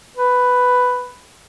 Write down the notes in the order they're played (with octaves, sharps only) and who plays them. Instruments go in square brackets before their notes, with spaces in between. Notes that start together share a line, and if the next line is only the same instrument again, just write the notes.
[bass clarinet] B4